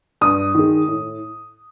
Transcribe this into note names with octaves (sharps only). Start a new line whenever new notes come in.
G2 D#6
D#3 G#3
A2